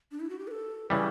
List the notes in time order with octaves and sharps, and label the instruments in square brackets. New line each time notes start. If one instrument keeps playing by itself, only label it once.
[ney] D4
E4
F#4
G4
B4
A4
[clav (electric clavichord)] C#3 E3 G3 [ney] B4